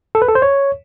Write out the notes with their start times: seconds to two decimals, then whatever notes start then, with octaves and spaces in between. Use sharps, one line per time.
0.15 A4
0.22 B4
0.29 A4
0.35 C5
0.42 C#5